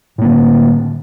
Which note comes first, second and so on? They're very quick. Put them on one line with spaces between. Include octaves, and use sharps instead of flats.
A2 A#3 D3